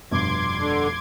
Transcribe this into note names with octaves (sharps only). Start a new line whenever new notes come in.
F1 G2 B2 C6 D6 G#6
D3